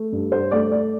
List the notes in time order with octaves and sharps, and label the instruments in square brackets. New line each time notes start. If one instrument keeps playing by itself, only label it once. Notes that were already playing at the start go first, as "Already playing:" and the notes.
Already playing: [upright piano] A3
G2
C5
A3 D5
D5